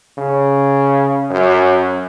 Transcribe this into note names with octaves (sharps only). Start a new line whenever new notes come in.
C#3
F#2